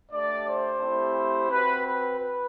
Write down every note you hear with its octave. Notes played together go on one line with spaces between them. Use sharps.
A3 D4 G4 D5
C5
A3 C4 E4 G4
C4 F#4 B4
B4
B4